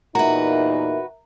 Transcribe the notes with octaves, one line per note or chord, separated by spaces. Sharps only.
E2 A#2 D#4 F#4 A#4 B4 E5 A#5